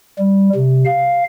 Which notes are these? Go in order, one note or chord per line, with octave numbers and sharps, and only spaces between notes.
G3
C3
F5